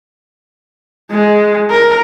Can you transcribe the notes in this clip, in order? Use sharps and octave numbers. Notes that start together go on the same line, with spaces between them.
G#3
A#4